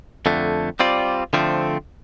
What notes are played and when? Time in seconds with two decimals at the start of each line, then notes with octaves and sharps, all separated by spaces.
0.26 F2 D3 A3
0.80 G3 C4 F4 D5
1.33 D3 F3 A3 C4